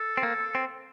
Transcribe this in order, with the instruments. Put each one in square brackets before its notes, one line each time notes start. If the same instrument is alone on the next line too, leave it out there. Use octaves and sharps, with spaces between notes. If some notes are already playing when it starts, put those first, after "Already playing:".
Already playing: [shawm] A4
[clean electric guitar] C4
A#3
C4